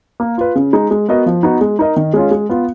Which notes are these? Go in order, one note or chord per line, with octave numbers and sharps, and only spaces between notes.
A#3
F4 B4
C#3
G#3 D#4
G#3
B3 F#4 A#4 D#5
F3
B3 D#4 F#4
G#3
D#4 A#4 D#5
D#3
G#3 C#4 F4
G#3
B3 F4